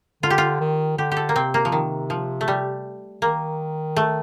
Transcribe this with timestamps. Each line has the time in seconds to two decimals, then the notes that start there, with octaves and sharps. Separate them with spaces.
0.23 D3 F4
0.30 G4
0.38 F4
0.60 D#3
0.98 D3 G4
1.12 G4
1.17 A4
1.29 A#3
1.36 C3 C4
1.54 A#3
1.65 F3
1.72 C3 D#3
2.10 F3
2.41 A3
2.48 G3
3.22 D#3 A#3
3.96 A3